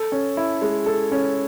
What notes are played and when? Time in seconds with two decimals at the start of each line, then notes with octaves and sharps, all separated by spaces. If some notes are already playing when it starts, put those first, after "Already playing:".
Already playing: A4
0.12 C#4
0.37 E4
0.62 G#3
0.86 A4
1.12 C#4